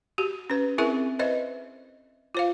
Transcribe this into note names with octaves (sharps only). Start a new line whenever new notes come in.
F#4 G4
C#4 B4
C4 E4 G#4 A#4 E5 C#6
B4 C5 D#5 E5
F4 C5 F5